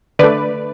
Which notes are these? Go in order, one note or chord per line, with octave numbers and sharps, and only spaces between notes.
D3 A3 B4 D5